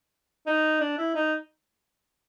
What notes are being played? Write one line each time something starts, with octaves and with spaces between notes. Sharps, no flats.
D#4
D4
E4
D#4